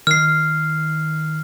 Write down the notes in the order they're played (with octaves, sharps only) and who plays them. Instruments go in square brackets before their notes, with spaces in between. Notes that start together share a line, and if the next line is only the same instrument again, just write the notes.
[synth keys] D#3 [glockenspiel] F6 C7